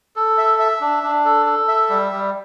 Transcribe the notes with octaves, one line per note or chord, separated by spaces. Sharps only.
A4
E5
E5
D4
D4
A4
A4
E5
G3
G3